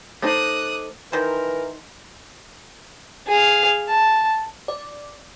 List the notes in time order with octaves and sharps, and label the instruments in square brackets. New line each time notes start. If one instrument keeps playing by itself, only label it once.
[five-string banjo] A3 D#4 C5 [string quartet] D6 D#6 F#6
[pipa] D#3 C5 [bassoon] E3 [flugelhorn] A#4
[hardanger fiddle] G#4 F5
A5
[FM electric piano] D5